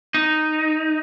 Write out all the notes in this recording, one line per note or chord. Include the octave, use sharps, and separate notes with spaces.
D#4